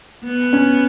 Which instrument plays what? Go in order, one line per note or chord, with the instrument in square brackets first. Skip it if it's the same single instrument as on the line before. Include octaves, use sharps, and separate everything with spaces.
[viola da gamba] B3
[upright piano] C#4